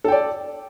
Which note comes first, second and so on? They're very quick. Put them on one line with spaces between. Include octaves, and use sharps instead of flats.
A4 G5 D5